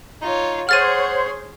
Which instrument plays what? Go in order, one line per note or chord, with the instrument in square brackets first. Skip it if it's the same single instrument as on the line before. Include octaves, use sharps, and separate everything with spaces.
[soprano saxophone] D#4 [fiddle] F4 C#5
[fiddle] G#4 [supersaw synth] C5 C#5 C6 [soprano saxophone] F#5 [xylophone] F6 A6 D#7